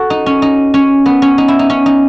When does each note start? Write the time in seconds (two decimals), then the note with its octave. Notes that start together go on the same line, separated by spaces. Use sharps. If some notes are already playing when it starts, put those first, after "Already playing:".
Already playing: F#4 A4
0.10 D#4
0.26 C#4
0.42 D#4
0.74 C#4
1.06 B3
1.22 C#4
1.38 D#4
1.48 E4
1.59 D#4
1.70 C#4
1.86 D#4